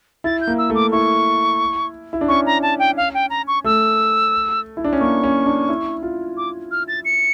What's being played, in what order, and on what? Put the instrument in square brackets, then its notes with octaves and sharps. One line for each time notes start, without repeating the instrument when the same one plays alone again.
[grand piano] E4 [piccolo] A6
[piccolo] G6
[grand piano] A#3
[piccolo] E6
[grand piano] A3
[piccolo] D6
[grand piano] E4 [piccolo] C#6
[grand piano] E4
D4
[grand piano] C#4 [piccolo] C#6
[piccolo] A#5
A5
G5
F5
G5
A#5
C#6
[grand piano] A3 [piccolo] E6
[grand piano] E4
D4
C#4
[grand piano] A#3 [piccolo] C#6
[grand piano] C#4
D4
E4
F4
[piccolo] D6
F6
A6
C#7